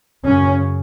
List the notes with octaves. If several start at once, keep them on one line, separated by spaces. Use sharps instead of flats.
F#2 C#3 C#4